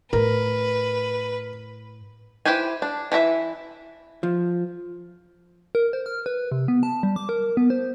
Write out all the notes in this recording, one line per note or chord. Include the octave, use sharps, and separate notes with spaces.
A2 A#4 B4
E4 G4 B4 C5 G#5
D4
E3 E4 F#4 E5
F3
A#4
C5
F6
B4
C3
B3
A5
G3
D6
A#4
B3
C5